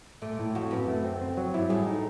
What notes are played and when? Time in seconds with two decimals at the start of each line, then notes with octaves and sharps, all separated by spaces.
0.22 A#2 A3
0.39 A2
0.55 F2 F#4
0.71 F#2 B4
0.88 A3
1.05 C4
1.21 C4
1.37 F#3
1.54 G2 E4
1.70 A2 G#4
1.87 D#4